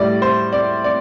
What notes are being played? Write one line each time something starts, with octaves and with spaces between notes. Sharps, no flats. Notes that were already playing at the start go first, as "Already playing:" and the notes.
Already playing: A2 G3 D5
C5
D5
D5